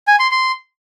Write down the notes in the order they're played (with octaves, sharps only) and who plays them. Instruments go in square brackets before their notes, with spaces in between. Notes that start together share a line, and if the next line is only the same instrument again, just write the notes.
[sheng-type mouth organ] G#5
C6
C6